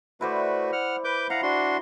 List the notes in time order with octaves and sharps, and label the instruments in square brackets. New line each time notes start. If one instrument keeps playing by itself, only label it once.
[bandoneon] A3 F#4 B4 [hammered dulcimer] E4 C5 D5
[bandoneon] F#5 F6
B4 D6 G6
[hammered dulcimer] E4 [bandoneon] F5 F#5 A#5
[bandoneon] D4 F#4 C6